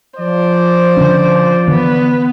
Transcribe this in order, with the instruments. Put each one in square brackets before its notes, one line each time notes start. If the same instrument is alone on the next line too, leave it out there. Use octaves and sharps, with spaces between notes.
[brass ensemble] F3 D5 [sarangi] C5
[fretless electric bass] D3 C#4 D4
[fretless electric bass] D3 E3 [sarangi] B3